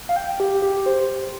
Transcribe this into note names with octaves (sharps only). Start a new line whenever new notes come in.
F5
G5
G4
G4
C5